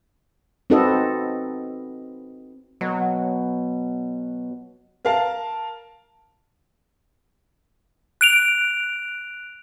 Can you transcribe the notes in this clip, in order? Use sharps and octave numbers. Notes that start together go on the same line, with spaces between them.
C4 D#4 F#4 A4 B4 D#5
B2 F#3
A#4 F5 A5
F#6 D7 F7